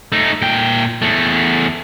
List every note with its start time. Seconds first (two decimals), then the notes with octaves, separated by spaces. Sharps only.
0.12 A3 D#4
0.42 A#2 G5
1.02 E2 A3